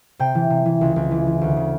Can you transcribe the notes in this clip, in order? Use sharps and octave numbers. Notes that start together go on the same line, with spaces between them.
C3 G5
E3
C3
E3
C#2
C#2
E3
E3
D2
C#3